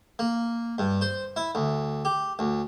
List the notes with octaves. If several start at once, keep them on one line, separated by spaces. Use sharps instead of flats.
A#3
G2
C5
E4
D2
G4
D2